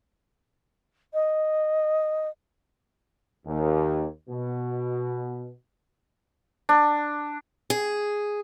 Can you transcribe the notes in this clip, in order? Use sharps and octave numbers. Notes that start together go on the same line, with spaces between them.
D#5
D#2
B2
D4
G#4